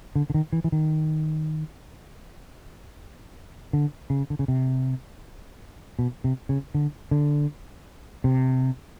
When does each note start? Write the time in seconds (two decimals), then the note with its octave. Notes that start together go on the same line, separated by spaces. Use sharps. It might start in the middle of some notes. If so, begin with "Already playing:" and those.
0.16 D3
0.30 D3
0.34 D#3
0.53 E3
0.64 E3
0.72 D#3
3.73 D3
4.10 C#3
4.30 D3
4.39 C#3
4.48 C3
5.99 B2
6.24 C3
6.49 C#3
6.75 D3
7.11 D3
8.24 C3